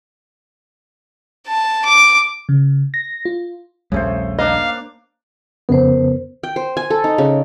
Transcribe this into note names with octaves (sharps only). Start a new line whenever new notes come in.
A5
D6
C#3
A#6
F4
A#1 D#2 C#3 G3 A3 C5
A#3 D4 D#5 F5
F2 C#3 B3 A#4 C5
G5
C5
G#5
A4
D#4
C#3